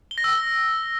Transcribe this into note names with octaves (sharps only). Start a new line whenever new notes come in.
G7
A#6
E6